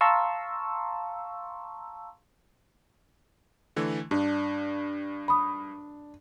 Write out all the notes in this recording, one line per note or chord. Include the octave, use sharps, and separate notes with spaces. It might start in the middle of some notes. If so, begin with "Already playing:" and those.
F5 A5 A#5 C6 C#6 E6
D3 E3 A3
G2 D4
B5 D#6